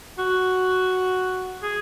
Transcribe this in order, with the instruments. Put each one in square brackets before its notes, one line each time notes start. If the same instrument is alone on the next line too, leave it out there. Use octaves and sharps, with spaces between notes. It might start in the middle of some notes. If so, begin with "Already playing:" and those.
[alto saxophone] F#4
G#4